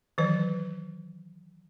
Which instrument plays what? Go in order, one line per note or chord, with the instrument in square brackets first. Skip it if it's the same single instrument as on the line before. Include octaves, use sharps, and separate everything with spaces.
[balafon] D#3 E3 F#3 B4